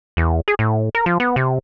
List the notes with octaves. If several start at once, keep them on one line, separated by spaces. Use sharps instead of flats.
E2
G#4
A2
A#4
F3
B3
C3